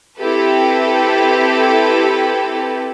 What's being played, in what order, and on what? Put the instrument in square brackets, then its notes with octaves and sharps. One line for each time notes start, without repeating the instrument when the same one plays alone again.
[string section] C4 E4 G4 A4 B4